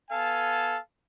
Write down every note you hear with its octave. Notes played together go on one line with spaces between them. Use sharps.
B3 A4 F5 G#5 A5